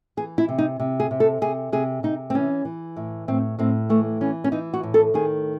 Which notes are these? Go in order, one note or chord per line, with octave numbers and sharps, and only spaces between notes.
E3 G#4
E4
C3
D#4
C3
G#4
C3
A4
C3 G#4
C3 G#4
C3 D#4
C4
E3 C#4
E3
A2
A2 C4
A2 C4
E3 A3
E3 C#4
C#4
E3 D#4
F#4
A2
A4
D#3 G#4